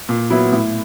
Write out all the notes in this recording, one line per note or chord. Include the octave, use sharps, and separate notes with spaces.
A#2
F#3 B3 E4
A2